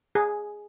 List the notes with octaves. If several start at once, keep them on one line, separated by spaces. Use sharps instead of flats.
G#4